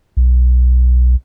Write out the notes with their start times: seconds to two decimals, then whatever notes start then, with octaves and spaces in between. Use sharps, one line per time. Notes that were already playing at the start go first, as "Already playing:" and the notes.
0.17 B1